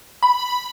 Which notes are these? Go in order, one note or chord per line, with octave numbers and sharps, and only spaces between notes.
B5